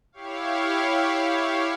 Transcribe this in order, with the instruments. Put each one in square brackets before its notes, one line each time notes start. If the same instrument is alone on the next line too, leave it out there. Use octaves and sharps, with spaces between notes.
[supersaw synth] E4 G4 C#5 F5